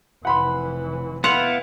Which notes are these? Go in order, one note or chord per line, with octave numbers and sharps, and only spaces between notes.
F1 E3 F#5 B5 C6
B3 E4 F5 F#5 C6 F6